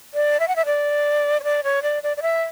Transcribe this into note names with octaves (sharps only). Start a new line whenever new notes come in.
D5
E5
F#5
E5
D5
C#5
D5
C#5
D5
D5
D5
E5